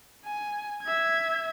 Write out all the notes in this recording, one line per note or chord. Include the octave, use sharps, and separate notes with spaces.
G#5
E5 G#6